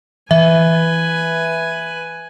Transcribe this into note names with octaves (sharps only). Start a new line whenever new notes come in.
E3 B4 E5 G#5